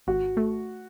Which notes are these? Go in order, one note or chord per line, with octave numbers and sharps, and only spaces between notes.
G#1 F#4
A3